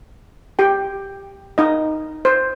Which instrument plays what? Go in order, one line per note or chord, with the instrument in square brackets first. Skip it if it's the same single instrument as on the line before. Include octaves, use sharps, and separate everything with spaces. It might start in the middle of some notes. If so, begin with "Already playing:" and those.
[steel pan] G4 G5
D#4 D#5
C5